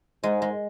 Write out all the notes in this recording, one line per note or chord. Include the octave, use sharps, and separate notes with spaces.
G#2 G#3
G#3